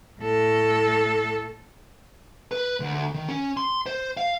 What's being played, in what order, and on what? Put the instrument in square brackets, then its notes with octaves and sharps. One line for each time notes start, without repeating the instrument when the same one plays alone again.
[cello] A2 A4
[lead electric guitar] B4
D2
D#3
C#4
C6
C5
F5